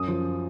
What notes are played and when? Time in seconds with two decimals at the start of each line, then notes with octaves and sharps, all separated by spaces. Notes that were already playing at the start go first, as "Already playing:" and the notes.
Already playing: F#2 D#6
0.08 F3